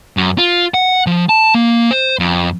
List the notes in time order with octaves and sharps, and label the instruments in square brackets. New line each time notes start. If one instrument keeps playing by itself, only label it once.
[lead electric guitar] F#2
F4
F#5
F3
A5
A#3
C5
F2